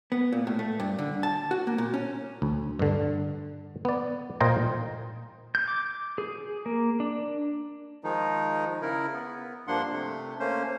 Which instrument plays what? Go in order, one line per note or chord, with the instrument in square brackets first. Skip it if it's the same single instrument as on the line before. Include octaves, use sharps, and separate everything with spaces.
[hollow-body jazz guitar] B3
A#2
A2
A3
G2
D3
A5
F#4
A#3
A#2
C#4
[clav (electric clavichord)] D2
G2 D3
B3 D5
A#2 F4 C5 D#5 G5 A#5
[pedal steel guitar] G6
D6
G#4
A#3
D4
[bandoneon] D#3 F3 G#3 D#4
C#3 E4 A#4
B3
G2 F3 A#3 D4 F#5 C6
C3 A3
A3 A#3 C#4 C5